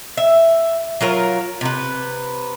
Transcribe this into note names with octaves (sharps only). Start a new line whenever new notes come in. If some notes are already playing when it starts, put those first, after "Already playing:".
E5
F#3 F4 A#4 C#5
C3 B4